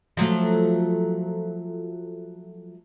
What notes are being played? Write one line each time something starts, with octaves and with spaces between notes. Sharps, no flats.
F3 F#3 A3